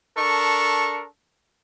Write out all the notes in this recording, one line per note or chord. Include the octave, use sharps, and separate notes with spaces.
D4 A4 A#4 C#6